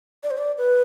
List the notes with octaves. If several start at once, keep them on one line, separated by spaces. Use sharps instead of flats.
D5
C5
D5
B4